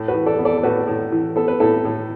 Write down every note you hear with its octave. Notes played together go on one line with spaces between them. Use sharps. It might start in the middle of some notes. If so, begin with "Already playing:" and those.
Already playing: A2
F#4 B4
E3
A4 D5
B3
A4 D5
A4
A2 F#4 B4
A2
E3
B3 A4
B4
A2 E4 A4
A2